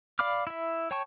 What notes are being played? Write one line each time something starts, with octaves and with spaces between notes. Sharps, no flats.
D5 F5 B5 D6 F6
E4 E5
C#5 G5 A5 C#6